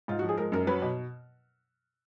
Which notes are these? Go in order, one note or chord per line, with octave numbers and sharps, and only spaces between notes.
G#2 F4
F#4
F3
G#4
G#3 A#4
F#2 A#4
F#3 B4
B2